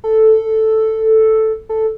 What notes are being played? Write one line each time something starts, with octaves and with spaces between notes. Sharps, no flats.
A4
A4